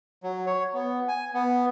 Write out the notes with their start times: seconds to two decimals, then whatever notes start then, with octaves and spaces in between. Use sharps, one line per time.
0.23 F#3
0.46 C#5
0.74 B3
1.08 G#5
1.34 B3